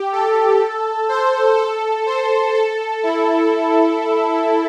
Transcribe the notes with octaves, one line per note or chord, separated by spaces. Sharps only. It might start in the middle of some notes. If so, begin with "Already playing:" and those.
Already playing: G4
A4
C5
A4
C5
A4
E4